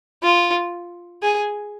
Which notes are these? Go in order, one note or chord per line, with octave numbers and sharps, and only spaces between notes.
F4
G#4